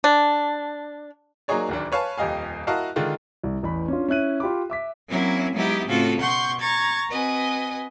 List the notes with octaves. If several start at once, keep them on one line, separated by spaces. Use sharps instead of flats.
D4
F#3 A#3 D#4 G#4 C#5 D5
D1 D#2 D4
B4 C#5 F5 G#5 A5
D#1 F2 G4 D#5 F5 G#5
E4 F#4 A#4 D#5 F5 A5
D3 D#3 G#3 F4
C2
A1 E2 B5
C#4 D4 F4
C#4 E4 F#6 D#7
F4 G4 B5 D6
E5 D6 B6
F#3 A#3 C4 C#4 E4
F#3 G#3 B3 D#4 E4 G4
A2 C#3 C4 F4 F#4 A4
B2 F#5 C6 C#6 G6
A#5 C#6 G#6 A6
C4 F#4 B4 D#5 G#5